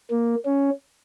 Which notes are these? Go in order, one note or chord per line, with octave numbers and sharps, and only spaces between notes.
A#3
C#4